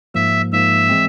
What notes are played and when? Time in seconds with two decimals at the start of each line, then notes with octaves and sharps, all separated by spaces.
0.14 G#2 F3 A#3 E5
0.52 G#2 F3 A#3 E5
0.89 E3 G#3 C4